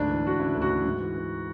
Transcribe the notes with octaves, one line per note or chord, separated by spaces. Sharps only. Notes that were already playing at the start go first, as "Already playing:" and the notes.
Already playing: D2 G#2 D4
E3
D2 F#4
C#3 E4
D2
F#4
E3
G#2
E3
E3